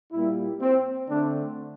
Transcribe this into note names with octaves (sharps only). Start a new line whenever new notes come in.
A#2 G3 A#3 E4
C4
D3 A3 C4 D4